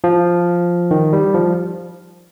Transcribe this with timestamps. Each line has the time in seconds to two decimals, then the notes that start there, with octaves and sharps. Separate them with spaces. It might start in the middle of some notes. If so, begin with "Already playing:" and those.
0.04 F3
0.91 D#3
1.13 G3
1.34 F3